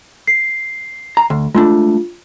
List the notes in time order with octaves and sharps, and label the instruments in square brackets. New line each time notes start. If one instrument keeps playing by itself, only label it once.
[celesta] C7
[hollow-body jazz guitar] A#5
D2
[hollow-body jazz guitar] G#3 A3 D4 [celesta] F4